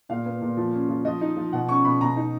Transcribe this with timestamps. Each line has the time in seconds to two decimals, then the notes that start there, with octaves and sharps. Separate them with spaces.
0.09 A#2 F5
0.26 B3
0.41 A#2
0.57 F3
0.73 C#4
0.89 F3
1.05 F3 D#5
1.21 D#4
1.36 F3
1.53 B2 F#5
1.69 C#4 C#6
1.84 B2 B5
2.01 B2 A#5
2.16 D#4